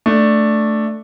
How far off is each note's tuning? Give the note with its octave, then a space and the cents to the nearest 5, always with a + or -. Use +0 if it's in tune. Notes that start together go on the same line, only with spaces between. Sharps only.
A3 +0 D4 +0